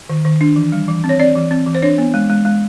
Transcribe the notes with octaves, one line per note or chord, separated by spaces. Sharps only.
D#3
D#3
D4
E3
G3
E3
C4
C#5
C4 D5
E3
C4
E3
C5
D4 C#5
B3
G#3
G#3
G#3